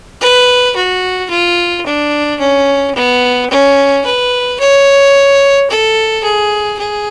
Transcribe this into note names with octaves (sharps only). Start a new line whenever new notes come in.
B4
F#4
F4
D4
C#4
B3
C#4
B4
C#5
A4
G#4
G#4